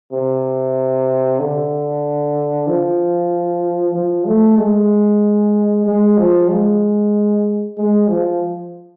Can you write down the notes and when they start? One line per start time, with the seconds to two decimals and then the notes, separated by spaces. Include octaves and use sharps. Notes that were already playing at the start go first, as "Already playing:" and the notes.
0.12 C3
1.40 D3
2.67 F3
3.95 F3
4.27 A3
4.58 G#3
5.86 G#3
6.18 F3
6.50 G#3
7.78 G#3
8.09 F3